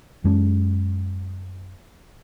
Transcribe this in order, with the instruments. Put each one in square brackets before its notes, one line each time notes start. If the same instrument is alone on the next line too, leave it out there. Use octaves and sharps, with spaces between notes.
[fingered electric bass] F#2 G#3 C#4